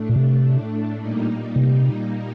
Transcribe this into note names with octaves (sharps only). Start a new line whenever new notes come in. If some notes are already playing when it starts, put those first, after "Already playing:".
Already playing: A2 A3 D4
A#2
C3
A#2 G3 A#3 D#4
C3